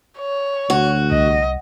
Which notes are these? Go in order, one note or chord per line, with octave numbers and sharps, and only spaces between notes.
C#5
D2 F#4
C2 D#5